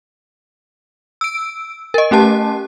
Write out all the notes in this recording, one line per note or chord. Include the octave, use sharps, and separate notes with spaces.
E6 D7
A#4 D#5
A3 C#4 G4 A5